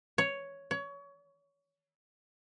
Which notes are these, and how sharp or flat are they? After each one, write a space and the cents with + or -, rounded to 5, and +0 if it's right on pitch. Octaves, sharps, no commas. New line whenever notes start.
C#5 +5
C#5 +25